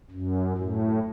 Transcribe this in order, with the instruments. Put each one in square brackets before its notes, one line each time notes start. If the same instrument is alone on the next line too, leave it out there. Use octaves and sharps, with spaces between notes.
[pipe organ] F#2
A2